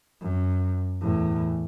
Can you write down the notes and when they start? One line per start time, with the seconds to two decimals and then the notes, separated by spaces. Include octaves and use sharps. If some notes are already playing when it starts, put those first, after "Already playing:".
0.21 F#2
1.00 E2 A2